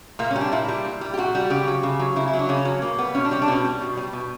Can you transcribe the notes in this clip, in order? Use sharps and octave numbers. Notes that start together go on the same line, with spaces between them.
A#2 A#3
C#4
G3
D4
A#2 E4
G3
A#2
G3
G4
A#2 F#4
G3
C#3 G4
F#3
C#3
F#3
C#3 E4
E4
F#3
D4
C#3 C#4
F#3
B2 A#3
G3 B3
B2 C#4
D4
G3 C#4
D4
B2 C#4
G3
B2
G3
B2